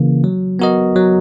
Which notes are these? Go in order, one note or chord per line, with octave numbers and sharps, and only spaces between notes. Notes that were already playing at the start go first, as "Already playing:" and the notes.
Already playing: C#3 E3 A#3
F#3
B3 F#4 A#4 D#5
F#3